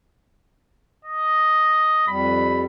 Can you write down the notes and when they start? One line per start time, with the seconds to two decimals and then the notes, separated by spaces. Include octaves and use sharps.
1.05 D#5
2.08 F2 G3 B5